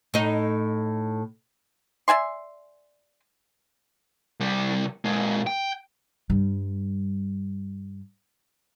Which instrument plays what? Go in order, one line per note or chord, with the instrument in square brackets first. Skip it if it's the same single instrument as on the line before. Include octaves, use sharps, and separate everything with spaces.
[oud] A2 D#4
[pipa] D5 E5 G#5 C6
[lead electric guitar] C2 G3
A#2 G#3
G5
[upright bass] G2 G3